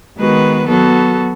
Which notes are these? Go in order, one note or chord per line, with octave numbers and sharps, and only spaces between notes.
D#3 G#3 B3 F#4 B4
F#3 B3 F#4 A4